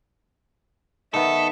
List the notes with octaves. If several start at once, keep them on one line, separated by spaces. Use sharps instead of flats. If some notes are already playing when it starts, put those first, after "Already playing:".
D#3 B3 A4 D#5 E5 C#6